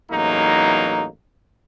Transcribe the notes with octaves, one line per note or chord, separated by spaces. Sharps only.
A1 E2 F#3 A#3 D#4